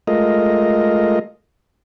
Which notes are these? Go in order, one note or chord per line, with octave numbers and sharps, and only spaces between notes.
G#3 A3 F4 A#4 D#5